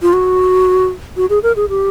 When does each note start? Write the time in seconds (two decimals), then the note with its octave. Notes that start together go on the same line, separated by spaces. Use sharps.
0.02 F4
0.13 F#4
1.17 F#4
1.30 G#4
1.43 A#4
1.56 G#4
1.69 G4